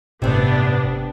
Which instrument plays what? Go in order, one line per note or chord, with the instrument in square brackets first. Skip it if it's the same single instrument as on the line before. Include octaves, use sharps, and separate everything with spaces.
[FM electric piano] G1 A2 [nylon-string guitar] C3 C4 [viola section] B3 D4